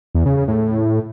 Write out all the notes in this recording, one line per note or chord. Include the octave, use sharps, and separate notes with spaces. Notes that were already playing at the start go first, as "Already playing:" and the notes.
E2
C#3
C#3
A2